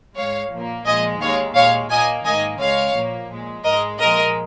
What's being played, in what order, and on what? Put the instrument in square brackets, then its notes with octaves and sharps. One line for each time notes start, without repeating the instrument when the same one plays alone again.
[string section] G#2 G#3 C#5 F5
A#2 F3 A#3
A#2 F3 G#3 D#5 G#5
D#2 D#3 G#3 C#5 F5
A#2 G#3 C#5 F5
A#2 A#3 D#5 G#5
G#2 D#3 A#3 D#5 G#5
C#2 C#3 G#3 C#5 F5
A#2 F3 A#3
A#2 G#3
G#2 A#4 D#5
G#3
A#2 F3 G#3 A#4 D#5